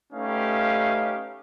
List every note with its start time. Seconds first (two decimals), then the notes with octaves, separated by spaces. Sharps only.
0.13 A3 C#4 D#4 G4 B4 F5